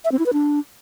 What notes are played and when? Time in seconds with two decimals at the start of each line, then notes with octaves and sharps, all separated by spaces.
0.05 E5
0.12 C4
0.19 E4
0.26 B4
0.33 D4